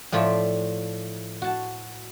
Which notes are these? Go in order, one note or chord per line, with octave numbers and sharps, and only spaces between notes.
A2 F3 A3 F4 D5 E5
F#4 A5